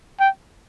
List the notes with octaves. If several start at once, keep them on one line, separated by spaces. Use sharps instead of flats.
G5